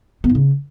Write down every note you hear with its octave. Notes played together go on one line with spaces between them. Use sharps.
B3
G#2
C#3